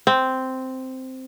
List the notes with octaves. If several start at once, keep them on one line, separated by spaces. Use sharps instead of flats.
C4